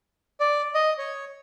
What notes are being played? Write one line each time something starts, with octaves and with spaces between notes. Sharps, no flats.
D5
D#5
C#5